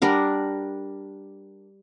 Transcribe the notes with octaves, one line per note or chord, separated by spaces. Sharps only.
G3 D4 A#4 F#5